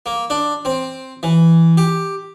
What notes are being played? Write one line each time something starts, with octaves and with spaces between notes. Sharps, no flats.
A#3
D4
C4
E3
G4